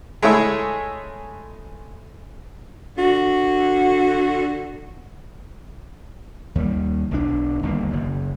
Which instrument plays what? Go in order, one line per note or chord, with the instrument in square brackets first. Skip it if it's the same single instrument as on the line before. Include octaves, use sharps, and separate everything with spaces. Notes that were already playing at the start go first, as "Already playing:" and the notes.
[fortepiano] G#3 A3 E4 C#5 E5
[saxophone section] D3 F#4
[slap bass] D#2 G3
B1 F3 D4
G1 D#2 C#3 A#3
F#1 F#2